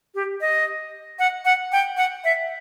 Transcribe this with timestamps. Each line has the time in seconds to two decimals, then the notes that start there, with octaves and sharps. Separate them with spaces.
0.15 G4
0.41 D#5
1.19 F#5
1.45 F#5
1.72 G5
1.97 F#5
2.24 E5